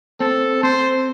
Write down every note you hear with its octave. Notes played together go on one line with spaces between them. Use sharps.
C4 A4
C4 C5